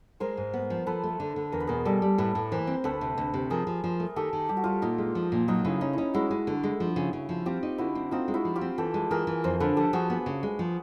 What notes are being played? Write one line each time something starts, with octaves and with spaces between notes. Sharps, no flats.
G#3 A#4 C5
G#2
B3
F3
F3 A4 B4
A3
D3
D3
E2 A#4
B4
B2 G#4 A#4
G3 G4 A4
G3
A2 A4 B4
A2
E3 A#4 C5
C4
D2 A4 B4
C3
D2
C3
F3 G#4 A#4
F3
F3
A3
D#3 G4 A4
D#3
G3 G4
F#4
G3 F4 G4
A#2 D#4 F4
G#3
F3
A#2
F#3 D#4 F4
C#3 E4
C#4 D#4
C#4 D#4 E4
G#3 E4 F#4
G#3
D3
G#3
F3
C#3
C#3
F3
C4 F4 G4
D#4
D3 E4 F#4
C4
C4 D#4 F4
G#3
E4 F#4
F3
F4 G4
C4
E3 G4 A4
G#3
E3 G#4 A#4
E3
F2 A#4 C5
D3 A4 B4
F3 G4 A4
F3 F#4 G#4
B3
C#3
G#3
F3